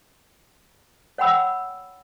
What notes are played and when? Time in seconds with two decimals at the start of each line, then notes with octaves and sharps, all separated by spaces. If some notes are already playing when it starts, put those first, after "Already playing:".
1.18 C#5 F#5 G5 B5 E6